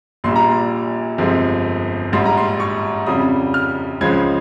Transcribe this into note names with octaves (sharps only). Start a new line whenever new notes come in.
A#1 A#2 G3 C6
A#5
C6
G1 F2 C3 F3 G#3
A#1 G#2 G3 C6
A#5
C6
C#6
F2 C#3 G3 D#6
F6
C#2 C#3 F3 G#3 G#6